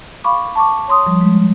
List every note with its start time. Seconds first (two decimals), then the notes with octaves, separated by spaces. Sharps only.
0.24 F5 B5 C#6 D6
0.56 A5 C#6 D6
0.88 C#5 C6 D#6
1.07 F3 G3
1.21 G#3